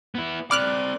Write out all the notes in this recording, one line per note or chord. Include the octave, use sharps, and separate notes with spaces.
B3 E4
C4 D5 B5 D6 F6 F#6